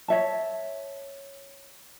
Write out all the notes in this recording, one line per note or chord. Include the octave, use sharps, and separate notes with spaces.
C#5 E5 A5